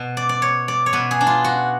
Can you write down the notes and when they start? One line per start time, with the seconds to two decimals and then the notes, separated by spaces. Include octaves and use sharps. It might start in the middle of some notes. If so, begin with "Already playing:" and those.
Already playing: B2
0.17 D5
0.29 D5
0.42 C#5
0.68 D5
0.86 C#5
0.93 B2 B4
1.11 G#4
1.21 D4
1.27 F4
1.44 F#4